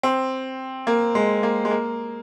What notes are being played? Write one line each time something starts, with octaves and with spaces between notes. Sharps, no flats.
C4
A#3
G#3
A#3
G#3
A#3